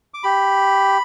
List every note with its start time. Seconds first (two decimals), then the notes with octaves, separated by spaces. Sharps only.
0.14 D6
0.23 G4 B5